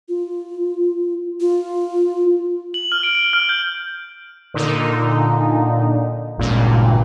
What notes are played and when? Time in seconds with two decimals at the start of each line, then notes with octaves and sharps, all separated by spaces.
0.09 F4
1.40 F4
2.74 F#7
2.92 F6
3.03 D7
3.15 D7
3.33 F6
3.49 G6
4.54 A#2 D3 D#4
6.38 G#1 C#2 G2 A#2